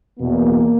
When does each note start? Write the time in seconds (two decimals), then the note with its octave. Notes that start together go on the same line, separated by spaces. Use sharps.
0.20 E2 B2 A#3